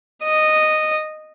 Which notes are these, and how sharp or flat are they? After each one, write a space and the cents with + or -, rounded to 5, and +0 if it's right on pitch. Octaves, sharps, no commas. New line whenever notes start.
D#5 -10